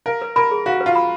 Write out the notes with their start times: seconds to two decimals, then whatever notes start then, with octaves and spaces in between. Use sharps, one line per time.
0.06 A#4 F5
0.22 B4
0.36 A#4 B5
0.51 G#4
0.66 F#4 F5
0.81 B4
0.86 F4
0.95 B5